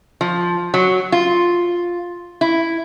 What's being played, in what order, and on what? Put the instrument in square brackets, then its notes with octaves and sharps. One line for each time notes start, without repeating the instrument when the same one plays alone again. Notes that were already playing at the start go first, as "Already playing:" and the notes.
[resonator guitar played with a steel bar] F3
F#3
F4
E4